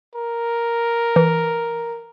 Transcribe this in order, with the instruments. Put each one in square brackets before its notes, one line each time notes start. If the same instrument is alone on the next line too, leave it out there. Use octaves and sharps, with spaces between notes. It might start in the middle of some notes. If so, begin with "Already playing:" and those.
[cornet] A#4
[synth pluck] E3